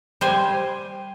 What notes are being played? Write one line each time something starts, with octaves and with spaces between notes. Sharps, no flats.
G3 C5 G#5